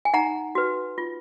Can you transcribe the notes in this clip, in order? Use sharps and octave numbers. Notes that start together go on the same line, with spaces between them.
G#5
D#4 F#5 A#5
F#4 B4
F4